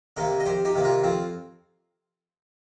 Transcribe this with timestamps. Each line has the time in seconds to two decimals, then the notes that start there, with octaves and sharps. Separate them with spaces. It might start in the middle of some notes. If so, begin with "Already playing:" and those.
0.17 C3 D#3 A#3 A#4 D#5
0.40 D#5
0.46 F2 G4 C5
0.65 D#4 G4
0.75 C3 D#3 A#3
0.84 F4 A#4
1.04 F2 C4 F4